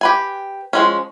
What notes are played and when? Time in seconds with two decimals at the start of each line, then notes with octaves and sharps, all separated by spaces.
0.01 G4 B4 G#5
0.73 F3 G#3 C#4